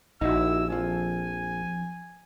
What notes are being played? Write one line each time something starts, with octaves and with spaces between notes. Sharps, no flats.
A#1 D#4 E4 F#4 E6
F2 F3 G#5